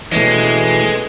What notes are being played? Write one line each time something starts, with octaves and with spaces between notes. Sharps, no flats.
B2 E3 G#3 A3 C#4